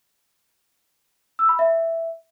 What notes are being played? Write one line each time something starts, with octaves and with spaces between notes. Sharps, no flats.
E6
B5
E5